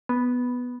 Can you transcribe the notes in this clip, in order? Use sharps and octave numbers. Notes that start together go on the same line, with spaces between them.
B3